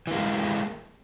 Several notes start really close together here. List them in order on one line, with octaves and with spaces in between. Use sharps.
E3 A#3 G#3